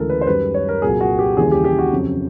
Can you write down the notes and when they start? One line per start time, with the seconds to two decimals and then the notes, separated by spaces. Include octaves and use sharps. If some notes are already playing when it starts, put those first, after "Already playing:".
Already playing: D2 C#3 E3 G#3 A4 A#4
0.09 B4
0.21 C5
0.27 F#2 D#3 G3 B4
0.54 C#5
0.69 A#4
0.82 C2 A#2 F#3 G#4
1.01 F#4
1.19 G4
1.37 D#2 C#3 E3 G3 G#4
1.51 G4
1.64 G4
1.79 F#4
1.92 F2 C#3 F#3